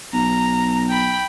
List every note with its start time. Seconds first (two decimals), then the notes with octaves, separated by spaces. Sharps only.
0.13 B1 A#5
0.90 G5 B5